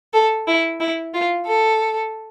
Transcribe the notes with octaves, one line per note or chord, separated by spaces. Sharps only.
A4
E4
E4
F4
A4